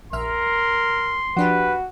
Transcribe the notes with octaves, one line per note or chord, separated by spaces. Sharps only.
A#1 A#4 E5 C6 F6
F3 D4 F#4 G4 B4